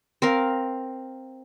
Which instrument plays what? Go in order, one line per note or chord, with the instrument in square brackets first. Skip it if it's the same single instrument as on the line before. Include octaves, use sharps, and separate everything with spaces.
[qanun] C4 A#4 F5